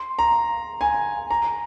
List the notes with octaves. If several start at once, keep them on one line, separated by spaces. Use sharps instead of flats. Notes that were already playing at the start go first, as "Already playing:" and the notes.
Already playing: C6
A#5
G#5
A#5